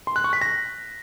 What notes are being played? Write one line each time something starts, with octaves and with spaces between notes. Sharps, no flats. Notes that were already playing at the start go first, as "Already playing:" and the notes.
C6
F#6
C#6
B6
A#6